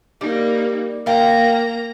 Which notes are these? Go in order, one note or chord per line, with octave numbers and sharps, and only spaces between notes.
G3 A#3 D#4
A#3 A#4 F5 G5 A#5